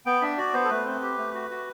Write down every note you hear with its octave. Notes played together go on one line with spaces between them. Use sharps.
B3 G5
D4 E5
F#4 D5
B3 C5
A4
A3 B4
C4
G4
A3
F#4
F#4